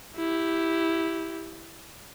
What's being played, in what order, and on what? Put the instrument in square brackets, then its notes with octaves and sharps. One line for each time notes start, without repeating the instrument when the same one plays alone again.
[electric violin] E4 G4